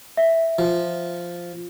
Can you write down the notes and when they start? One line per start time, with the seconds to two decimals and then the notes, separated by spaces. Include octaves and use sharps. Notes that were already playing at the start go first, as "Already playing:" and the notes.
0.17 E5
0.59 F3